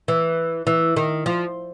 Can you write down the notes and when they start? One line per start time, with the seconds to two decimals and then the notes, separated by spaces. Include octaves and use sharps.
0.08 E3
0.67 E3
0.96 D#3
1.26 F3